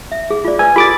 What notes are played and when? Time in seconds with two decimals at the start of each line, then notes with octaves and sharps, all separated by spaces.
0.12 E5
0.30 G#4
0.44 F4 D5
0.59 B4 G#5 E6
0.76 F4 G4 A4 B5 D6 A6